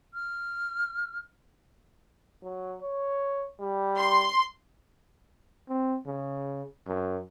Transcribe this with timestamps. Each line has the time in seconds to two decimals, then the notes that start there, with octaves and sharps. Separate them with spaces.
0.14 F6
2.43 F#3
2.82 C#5
3.60 G3
3.97 C6
5.69 C4
6.06 C#3
6.87 F#2